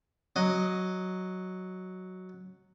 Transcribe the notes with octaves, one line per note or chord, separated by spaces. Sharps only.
F#3 D#5